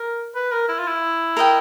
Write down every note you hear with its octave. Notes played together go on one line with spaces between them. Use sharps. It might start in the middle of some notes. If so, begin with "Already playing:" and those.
Already playing: A#4
B4
A#4
E4
F4
E4
A#4 D#5 G5